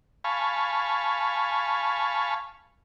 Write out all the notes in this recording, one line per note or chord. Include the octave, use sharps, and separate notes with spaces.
F5 G#5 A5 B5 C#6